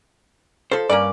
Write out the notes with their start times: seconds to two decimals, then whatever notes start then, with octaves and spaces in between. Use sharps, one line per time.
0.72 F3 A4 C5
0.90 G2 A#3 C#4 D5